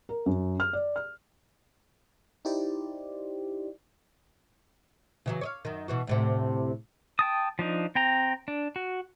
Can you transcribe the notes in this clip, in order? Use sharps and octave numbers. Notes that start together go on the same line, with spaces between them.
A#4
F#2
F6
D5
F6
D#4 E4 G4 C5 D5
C#3 E3 F#3
C#5 D#5 F5
F#2 D#3
B2 E3 F#4
D2 A2 C3
G5 A5 D#6
F3 D4 D#4
C4 G5 A#5
D4
F#4